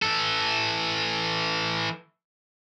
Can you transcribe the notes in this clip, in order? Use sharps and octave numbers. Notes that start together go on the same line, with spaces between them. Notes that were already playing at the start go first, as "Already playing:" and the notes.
E3 A4